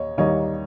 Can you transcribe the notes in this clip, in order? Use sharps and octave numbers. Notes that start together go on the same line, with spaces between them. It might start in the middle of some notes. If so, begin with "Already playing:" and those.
Already playing: D#2 C#5 D#5
D#2 D#3 G3 A#3 C#5 D#5